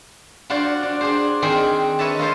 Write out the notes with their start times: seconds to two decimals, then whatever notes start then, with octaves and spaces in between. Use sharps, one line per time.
0.50 D4 F4 F#4 C5 D5
0.83 D4
1.01 D4 G#4 C5
1.42 D#3 C4 D4 G#4 A#4 C5
1.99 B4 C#5 D#5 E5 A5
2.19 F4 A#4 C5 D#5